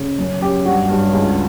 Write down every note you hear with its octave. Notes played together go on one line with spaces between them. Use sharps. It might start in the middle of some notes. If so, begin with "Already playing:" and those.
Already playing: C#3
F#2
F#2 G4
G2 F#4
G2
C#2